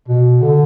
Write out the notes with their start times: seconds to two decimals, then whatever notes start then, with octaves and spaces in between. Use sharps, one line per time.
0.08 B2
0.41 D3